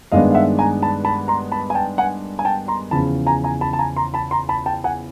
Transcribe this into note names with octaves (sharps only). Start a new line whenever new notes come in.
G2 D#3 G#3 B3 D4 D#5 F5
F5
E5 F#5
G#5 A#5
A5 B5
A5 B5
A#5 C6
A5 B5
G#5
G5 A5
F#5 G#5
G#5
G5 A5
A#5 C6
E2 C#3 F3 A5 B5
G#5 A#5
G#5 A#5
A5 B5
A5
G#5 A#5
A#5 C6
A5 B5
A#5 C6
A5 B5
G5 A5
F#5 G#5